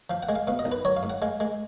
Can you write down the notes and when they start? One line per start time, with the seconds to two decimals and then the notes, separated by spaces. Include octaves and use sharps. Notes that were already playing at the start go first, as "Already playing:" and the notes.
0.10 F3 F5
0.23 F#5
0.29 G#3
0.35 F5
0.47 B2 F5
0.59 D#5
0.65 B1
0.72 B4
0.85 F#3 C#5
0.97 F5
1.03 G#2
1.10 F#5
1.22 G#3 F5
1.40 G#3